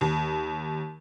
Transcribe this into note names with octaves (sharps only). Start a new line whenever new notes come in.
D#2